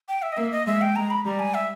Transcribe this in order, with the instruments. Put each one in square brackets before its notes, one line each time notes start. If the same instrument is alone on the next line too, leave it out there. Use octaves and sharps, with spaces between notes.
[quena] G5
E5
D#5
[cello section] A#3 [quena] E5
[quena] D#5
[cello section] G#3 [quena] E5
[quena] G5
[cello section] G#3 [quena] A#5
[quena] B5
[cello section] G3 [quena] A#5
[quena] G#5
E5